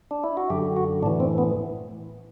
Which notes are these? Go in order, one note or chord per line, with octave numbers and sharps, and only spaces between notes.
D4
E4
F#4
F#2 D3 G4
F#4
A2 E3 D4
C4
B3